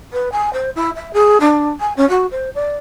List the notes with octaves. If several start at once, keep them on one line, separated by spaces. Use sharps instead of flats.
B4
G#5
C5
E4
E5
G#4
D4
G#5
C#4
F#4
C5
D5